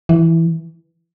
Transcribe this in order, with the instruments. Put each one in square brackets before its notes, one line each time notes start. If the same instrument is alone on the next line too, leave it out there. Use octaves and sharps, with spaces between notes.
[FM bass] E3